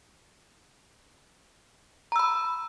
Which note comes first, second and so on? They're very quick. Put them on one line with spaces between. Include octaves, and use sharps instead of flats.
A#5 E6 B5